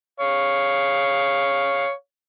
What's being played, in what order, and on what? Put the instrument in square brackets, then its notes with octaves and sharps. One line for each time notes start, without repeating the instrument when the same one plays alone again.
[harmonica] C#5 F5